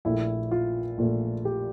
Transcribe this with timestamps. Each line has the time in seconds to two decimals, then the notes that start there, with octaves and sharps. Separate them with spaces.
0.05 A#1 A#2 A3 E4
0.51 F4
0.98 A#1 A#2 A3 F4
1.45 G4